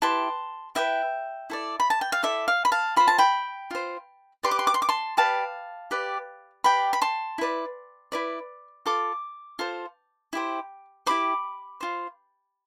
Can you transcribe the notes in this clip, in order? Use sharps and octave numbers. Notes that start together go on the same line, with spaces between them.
E4 G4 B4 A5 C6
E4 G4 B4 E5 G5
E4 A4 D5
B5
A5
G5
F5
E4 A4 D5 E5
F5
B5
F5 A5
F4 C5 B5
A5
G5 B5
F4 C5
G4 B4 D5 C6
D6
C6
D6
C6
D6
A5 C6
G4 B4 D5 F5 A5
G4 B4 D5
G4 B4 D5 G5 B5
B5
A5 C6
E4 B4 D5
E4 B4 D5
F4 A4 D6
F4 A4 C5
E4 G4 C5
E4 G4 C5 B5 D6
F4 C5